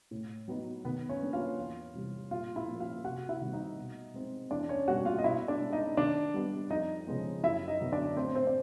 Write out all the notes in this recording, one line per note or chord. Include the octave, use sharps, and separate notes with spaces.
A2
F#3 B3 D#4
D#3 B3 B4
C#4 C#5
F#3 A#3 D4
F4 F5
E2
C3 E3 G3
A#2 F4 F5
E4 E5
F3 A#3 C#4
F4 F5
C3 F#4 F#5
E4 E5
D#3 G3 C4
D#4 D#5
B2
G#3 C4 D#4
E2 D4 D5
C#4 C#5
B2 G3 A#3 F#4 F#5
F4 F5
D#5
B2 E4 E5
D4 D5
G#3 C#4
D#4 D#5
D#3 D4 D5
G3 B3 D4
F2 D#4 D#5
C#3 F3 G#3 B3
F#2 E4 E5
D#4 D#5
D3 F#3 B3
D4 D5
A2 C4 C5
C4 C5
D5